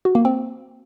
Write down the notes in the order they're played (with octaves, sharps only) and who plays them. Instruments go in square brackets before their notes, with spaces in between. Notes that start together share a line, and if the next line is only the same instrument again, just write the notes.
[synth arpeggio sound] F#4
A#3
C4